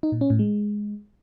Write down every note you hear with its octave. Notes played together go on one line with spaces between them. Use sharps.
D#4
A#2
C#4
A2
G#3